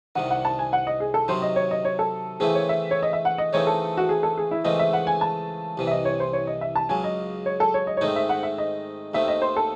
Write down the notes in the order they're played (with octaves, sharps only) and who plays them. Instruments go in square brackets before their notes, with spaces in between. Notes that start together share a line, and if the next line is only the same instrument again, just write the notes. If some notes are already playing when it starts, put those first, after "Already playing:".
[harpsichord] C2 C3 D#3 [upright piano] F#5
[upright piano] F#5
A5
G#5
F#5
D#5
G#4
A4
[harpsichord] C3 D#3 F#3 [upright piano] C5
[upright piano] D#5
C#5
D#5
C#5
A4
[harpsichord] C#3 E3 A3 C4 E4 [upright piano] G#4
[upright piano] C#5
E5
C#5
D#5
E5
F#5
D#5
[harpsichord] C#3 E3 A3 C4 D#4 [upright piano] C#5
[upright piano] A4
F#4
G#4
A4
G#4
E4
[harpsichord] C#2 C#3 E3 A3 C4 [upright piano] D#5
[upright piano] E5
F#5
G#5
A5
[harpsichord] C2 C3 E3
[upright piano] E5
D#5
C#5
C5
C#5
D#5
E5
A5
[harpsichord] C#2 C#3 F#3 [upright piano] G#5
[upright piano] D#5
C#5
A4
C#5
D#5
C#5
[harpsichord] G#2 D#3 A3 C4 D#4 [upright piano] D#5
[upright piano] E5
F#5
E5
D#5
[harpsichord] D#2 D#3 A3 C4 [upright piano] E5
[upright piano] D#5
C5
A4